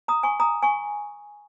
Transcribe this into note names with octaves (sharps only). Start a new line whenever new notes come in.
A#5 D#6
G#5 C#6
A#5 D#6
G#5 C#6